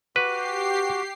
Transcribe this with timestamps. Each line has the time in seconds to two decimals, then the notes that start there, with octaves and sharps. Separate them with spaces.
0.16 F#4 G4 B4 D6 C7